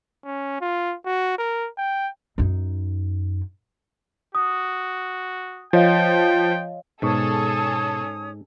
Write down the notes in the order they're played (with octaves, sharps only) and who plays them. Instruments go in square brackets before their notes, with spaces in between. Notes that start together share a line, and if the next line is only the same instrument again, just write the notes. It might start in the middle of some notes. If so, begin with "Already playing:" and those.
[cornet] C#4
F4
F#4
A#4
G5
[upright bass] F#2 D#4
[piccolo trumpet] F#4 [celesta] D#6
[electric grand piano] F3 [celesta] C#5 D#5 F5 [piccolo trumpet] G5
[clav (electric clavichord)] G#2 [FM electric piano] B2 B3 C#6 [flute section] C#4 D#6 [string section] G#4 A4